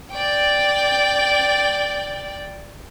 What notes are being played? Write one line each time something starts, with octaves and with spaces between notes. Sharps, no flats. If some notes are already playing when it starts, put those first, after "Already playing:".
D5 G5